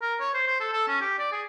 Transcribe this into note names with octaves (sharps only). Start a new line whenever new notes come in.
A#4
C#5
C5
C5
A4
A4
C#4
G4
D5
G#4